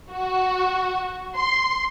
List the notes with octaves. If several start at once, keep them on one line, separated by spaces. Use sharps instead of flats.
F#4
C6